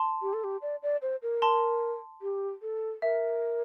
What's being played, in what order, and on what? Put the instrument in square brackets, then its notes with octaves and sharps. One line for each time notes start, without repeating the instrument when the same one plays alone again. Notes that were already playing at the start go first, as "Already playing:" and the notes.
Already playing: [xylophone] A5 C6
[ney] G4
A4
G4
D5
D5
C5
A#4
[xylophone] A5 C6
[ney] G4
A4
[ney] A#4 [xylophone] E5